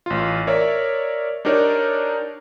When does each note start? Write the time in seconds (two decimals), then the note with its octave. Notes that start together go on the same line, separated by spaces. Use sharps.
0.06 A1 F4
0.47 A#4 C#5 D5 E5
1.45 D4 D#4 G4 A#4 C#5 D5